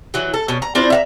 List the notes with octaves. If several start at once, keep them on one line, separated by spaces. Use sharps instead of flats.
E3 F#3
A4
B2 C#4
A#5
C4 D4 E4 F4
E5 F5 A#5